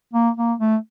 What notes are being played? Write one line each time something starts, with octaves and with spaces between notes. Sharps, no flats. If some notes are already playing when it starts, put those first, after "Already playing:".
A#3
A#3
A3